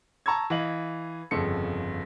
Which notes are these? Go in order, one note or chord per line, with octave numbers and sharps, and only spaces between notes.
A5 A#5 C#6 E6 G#6
E3 D#5 F5 F#7
G1 F2 C#3 A4 C#7